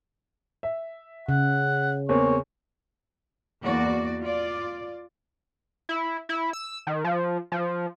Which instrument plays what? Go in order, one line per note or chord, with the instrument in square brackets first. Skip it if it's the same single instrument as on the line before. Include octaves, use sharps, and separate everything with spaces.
[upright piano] E5
[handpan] C#3 [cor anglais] F#5
[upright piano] E2 A#3 C4 [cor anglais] C#5
[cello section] E2 A#3 F#4 D5
F4 D5
[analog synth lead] E4
E4
E6
D#3
F3
F3